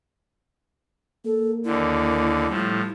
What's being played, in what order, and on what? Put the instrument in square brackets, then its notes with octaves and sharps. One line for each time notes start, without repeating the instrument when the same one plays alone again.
[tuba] A#3 [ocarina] A4
[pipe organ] D#2 D3 [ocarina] E4
[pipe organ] A2 F3 [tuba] G3